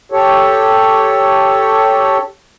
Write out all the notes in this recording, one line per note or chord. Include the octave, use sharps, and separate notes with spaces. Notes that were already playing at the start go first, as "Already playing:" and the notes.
G4 A4 C#5